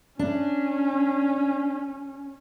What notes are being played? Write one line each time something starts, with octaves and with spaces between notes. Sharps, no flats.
C#4 D4